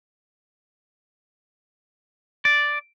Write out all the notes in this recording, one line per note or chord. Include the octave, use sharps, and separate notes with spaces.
D5